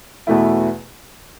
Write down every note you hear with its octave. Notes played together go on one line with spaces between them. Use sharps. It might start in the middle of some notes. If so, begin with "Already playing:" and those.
E2 B2 A3 E4